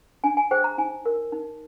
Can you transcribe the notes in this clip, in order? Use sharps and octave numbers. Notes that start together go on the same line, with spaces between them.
D4 G#5
G#5
G#4 C5 G5
A#5
D#4 G#5
A#4
D#4